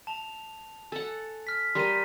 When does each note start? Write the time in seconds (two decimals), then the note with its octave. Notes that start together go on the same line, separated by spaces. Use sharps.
0.07 A5 F7
0.92 A4 F#5 G#5
1.47 F6 B6
1.75 G3 G4 A#4 C6 B6 D#7